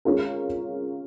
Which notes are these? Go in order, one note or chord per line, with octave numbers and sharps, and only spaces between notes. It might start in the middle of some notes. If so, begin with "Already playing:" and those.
G#3 C#4 F4 A#4